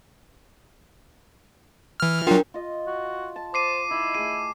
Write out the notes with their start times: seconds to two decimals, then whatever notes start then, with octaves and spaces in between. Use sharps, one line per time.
2.00 E3 F6
2.27 F#3 D4 F4 A#4 G5
2.54 F4 D#5
2.87 F#4
3.36 A5
3.54 C5 D6 C7 D#7
3.90 D#3 E4
4.14 A3 G#4 D#7